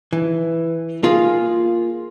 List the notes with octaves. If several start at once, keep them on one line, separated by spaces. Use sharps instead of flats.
E3
A#3 F4 G#4 F5